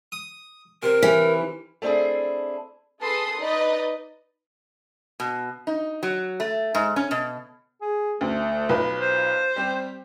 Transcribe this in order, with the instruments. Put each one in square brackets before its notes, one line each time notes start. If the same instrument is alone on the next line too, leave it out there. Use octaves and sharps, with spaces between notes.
[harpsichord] D#6
[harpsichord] C3 [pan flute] A#4
[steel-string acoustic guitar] E3
A3 C4 D4 E4 G#4
[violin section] G#4 A4 B4 A5 C6 D#6
D#4 B4 D5 D#5
[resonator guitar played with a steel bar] B2
D#4
F#3
A3
G#2
C#4
B2
[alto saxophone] G#4
[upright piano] D2 [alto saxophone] A3
[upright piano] B1 F4 B4
[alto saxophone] C5
[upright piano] G3 C4 G4